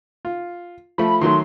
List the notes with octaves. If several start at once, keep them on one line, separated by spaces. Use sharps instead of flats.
F4
F3 A3 B5
D#3 F#3 A3 C6